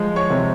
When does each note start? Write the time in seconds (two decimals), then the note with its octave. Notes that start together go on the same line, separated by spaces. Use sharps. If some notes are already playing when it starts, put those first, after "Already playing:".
Already playing: F3 G#3
0.16 C#5 C#6
0.30 C3